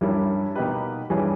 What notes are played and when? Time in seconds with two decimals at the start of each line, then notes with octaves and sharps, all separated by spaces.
0.01 G2 G3 C#4 E4 A#4
0.55 B2 A#3 D#4 G4 B4
1.10 G2 E3 G3 C#4 G#4